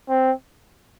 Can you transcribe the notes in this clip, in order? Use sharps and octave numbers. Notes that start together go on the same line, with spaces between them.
C4